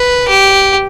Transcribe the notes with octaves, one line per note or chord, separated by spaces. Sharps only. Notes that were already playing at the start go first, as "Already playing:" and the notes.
Already playing: B4
G4